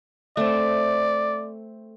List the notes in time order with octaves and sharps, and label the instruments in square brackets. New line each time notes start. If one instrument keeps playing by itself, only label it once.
[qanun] A3 C4 [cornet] D5